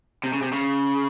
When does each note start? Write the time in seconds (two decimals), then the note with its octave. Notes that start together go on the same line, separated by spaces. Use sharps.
0.24 C3
0.33 C#3
0.42 C3
0.52 C#3